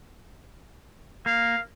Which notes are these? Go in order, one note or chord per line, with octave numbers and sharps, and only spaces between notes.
A#3 F5